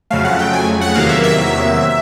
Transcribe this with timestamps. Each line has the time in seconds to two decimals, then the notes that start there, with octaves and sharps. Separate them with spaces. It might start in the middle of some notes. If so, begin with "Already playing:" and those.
0.10 F2 C#3 F#3 A3 F5
0.25 F#5
0.39 G5
0.53 G#5
0.81 F#5
0.94 E2 C3 D#3 F#3 A#3 F5
1.09 E5
1.24 E5